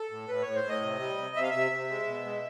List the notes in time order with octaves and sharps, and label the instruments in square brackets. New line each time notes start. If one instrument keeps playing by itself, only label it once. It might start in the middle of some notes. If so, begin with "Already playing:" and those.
Already playing: [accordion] A4
A2
A2 B4
A2 C#5
C5
A2 D#5
C3
G3
C3
C3 E5
F5
C3 E5
C3
G#3
B2
G#3